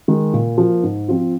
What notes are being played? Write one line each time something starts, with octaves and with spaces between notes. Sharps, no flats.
D#3 G#3
A#2
F3 A#3 F4
G#2
F3 C4 F4